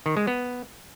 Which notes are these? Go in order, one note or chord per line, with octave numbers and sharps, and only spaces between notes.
D#3
G#3
B3